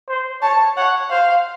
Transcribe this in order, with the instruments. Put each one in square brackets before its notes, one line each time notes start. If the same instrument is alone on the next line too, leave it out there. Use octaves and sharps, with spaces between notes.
[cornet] C5
[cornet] C#5 [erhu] A5
[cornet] C#5 [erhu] F#5
[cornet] C5 [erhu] F5